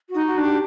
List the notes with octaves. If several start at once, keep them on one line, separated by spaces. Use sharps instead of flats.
F#4
D#4
F#4
D4
G4